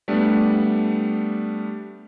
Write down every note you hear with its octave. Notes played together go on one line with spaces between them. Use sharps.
G3 A3 B3 D4